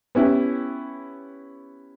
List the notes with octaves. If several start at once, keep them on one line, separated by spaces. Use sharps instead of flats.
B3 C#4 E4 G4